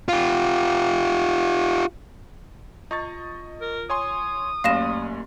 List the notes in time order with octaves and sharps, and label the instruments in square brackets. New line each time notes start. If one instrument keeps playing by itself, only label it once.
[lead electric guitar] F4 G4
[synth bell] F4 [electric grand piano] D#5 C#6 A6
[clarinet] A#4
[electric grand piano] C#5 G#5 C6 [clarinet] D#6
[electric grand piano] F#2 C#4 [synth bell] A3 A#3 G4 [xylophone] F5 A#6 E7